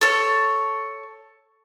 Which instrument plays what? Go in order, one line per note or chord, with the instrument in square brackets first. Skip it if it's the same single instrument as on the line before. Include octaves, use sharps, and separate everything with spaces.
[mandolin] A4 C#5